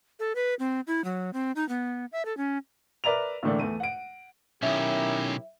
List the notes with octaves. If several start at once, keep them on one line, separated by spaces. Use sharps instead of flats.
A4
B4
C4
E4
F#3
C4
D#4
B3
E5
A4
C#4
A#4 B4 D5 E5 A#5 F7
A2 D3 E3 A3 A#3 D4
E2 A3 D#7
F#5 D7
B1 D#3 C#4 E4 G4 A#4 E5